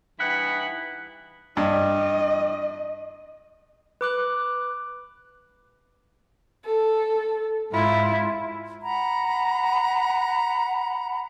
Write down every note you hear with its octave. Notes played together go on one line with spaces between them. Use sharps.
G2 E3 D#4 E4 B4 F#5
G2 D#5
B4 D6 F#6
A4
G#2 E4 F4
F#5 A#5 B5